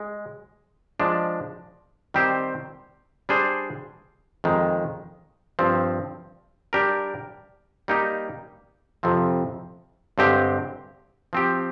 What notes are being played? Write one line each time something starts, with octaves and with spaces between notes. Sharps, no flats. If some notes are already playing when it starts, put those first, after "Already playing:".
Already playing: G#3
F3 G#3 D4
D#3 G3 C4 G4 C5
G3 D4 G#4 C5
F2 D#3 G#3
G2 F3 C4
G3 D4 G4 A#4
G3 A#3 D#4 G4
F2 C3 F3 C4
G2 D3 G#3 C4 G4
F3 C4 G4